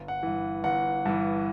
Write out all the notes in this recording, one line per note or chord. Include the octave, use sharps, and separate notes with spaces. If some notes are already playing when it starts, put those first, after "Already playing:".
Already playing: G1
F#5
G2 E3
G1 F#5
G2 E3